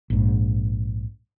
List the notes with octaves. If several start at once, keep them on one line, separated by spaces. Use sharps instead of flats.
A#1 G#2